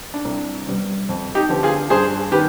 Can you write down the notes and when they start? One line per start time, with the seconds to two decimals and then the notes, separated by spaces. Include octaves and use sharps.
0.14 D4
0.25 C2
0.66 C3 G3 B3
1.09 F2
1.35 D#4 G4
1.49 D3 F3 B3
1.63 F4 G#4
1.90 G2 G#4 C5
2.32 D#3 B3 G4 B4